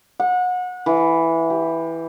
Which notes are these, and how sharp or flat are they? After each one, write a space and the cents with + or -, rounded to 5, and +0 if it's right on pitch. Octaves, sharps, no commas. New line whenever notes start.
F#5 -30
E3 +0
G4 +10